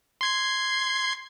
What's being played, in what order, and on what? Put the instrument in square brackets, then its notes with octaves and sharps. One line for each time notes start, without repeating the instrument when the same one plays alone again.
[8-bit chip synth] C6 G#6 C7